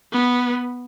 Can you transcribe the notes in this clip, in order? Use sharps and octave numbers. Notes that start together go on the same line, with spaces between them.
B3